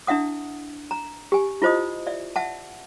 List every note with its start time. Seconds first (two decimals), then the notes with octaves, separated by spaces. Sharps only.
0.07 D4 E4 E5 F#5 D#6
0.91 A#5
1.32 G4 G#5
1.62 E4 F4 C5 D#5 D#6
2.07 D5 E5
2.36 E5 F#5 A5